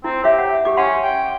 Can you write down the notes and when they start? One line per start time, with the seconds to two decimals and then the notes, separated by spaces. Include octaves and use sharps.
0.04 C4 E4
0.24 G4 C#5 E5
0.38 F#5
0.65 G4 D6
0.77 C#4 F#5 C6
1.02 G5